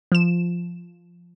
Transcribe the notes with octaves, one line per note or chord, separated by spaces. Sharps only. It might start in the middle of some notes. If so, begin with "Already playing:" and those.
F3 E7